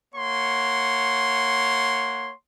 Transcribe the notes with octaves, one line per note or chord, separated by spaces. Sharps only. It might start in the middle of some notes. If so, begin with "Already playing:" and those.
A#3 C#5 F#5 C6